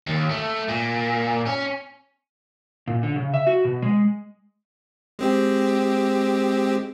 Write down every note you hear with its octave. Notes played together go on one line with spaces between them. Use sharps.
D#2
A3
A#2
C#4
A#2
D3
C#3
E5
F#4
B2
G#3
G#3 C4 G4